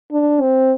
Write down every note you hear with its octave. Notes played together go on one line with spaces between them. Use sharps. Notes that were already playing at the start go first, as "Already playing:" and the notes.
D4
C4